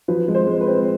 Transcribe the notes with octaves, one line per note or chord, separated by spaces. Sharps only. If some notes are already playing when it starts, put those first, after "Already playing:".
F3 B4
G#3
C5
G#3
B4
C4